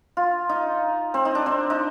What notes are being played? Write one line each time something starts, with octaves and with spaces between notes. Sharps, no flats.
F4
D#4
C4
D#4
D4
C4
D#4